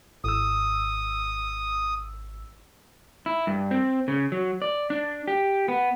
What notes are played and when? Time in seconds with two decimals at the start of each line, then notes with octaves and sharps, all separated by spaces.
0.24 G#1 D#6 E6
3.26 E4
3.47 G2
3.71 C4
4.08 C#3
4.32 F#3
4.62 D5
4.90 D4
5.28 G4
5.68 B3